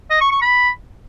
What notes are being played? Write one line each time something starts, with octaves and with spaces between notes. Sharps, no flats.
D#5
C#6
C#6
B5